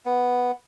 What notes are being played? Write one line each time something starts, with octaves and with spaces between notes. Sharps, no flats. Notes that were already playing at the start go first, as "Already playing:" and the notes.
B3